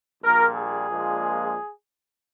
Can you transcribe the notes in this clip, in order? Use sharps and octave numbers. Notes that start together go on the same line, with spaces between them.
A#1 A#2 G3 A#4
G#4
A#1 A#2 F3 G#3